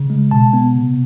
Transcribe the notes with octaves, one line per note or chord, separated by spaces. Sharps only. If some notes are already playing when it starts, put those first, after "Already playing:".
Already playing: C#3
G#3
B2 A5
B3
C3